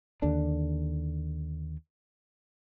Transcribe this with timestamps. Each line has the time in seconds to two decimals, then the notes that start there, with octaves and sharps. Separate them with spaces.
0.22 D#2 D3 D4